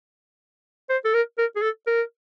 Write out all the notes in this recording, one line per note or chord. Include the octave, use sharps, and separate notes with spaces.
C5
A4
A#4
A#4
G#4
A4
A#4